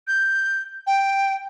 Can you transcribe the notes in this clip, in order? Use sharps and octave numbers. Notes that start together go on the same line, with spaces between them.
G6
G5